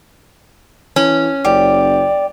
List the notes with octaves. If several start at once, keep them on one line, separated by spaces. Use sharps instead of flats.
E3 C#4
F#1 G4 D5